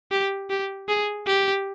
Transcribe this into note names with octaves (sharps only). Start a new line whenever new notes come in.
G4
G4
G#4
G4